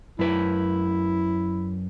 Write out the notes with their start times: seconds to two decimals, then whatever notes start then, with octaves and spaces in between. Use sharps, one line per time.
0.19 F#2 E4 B4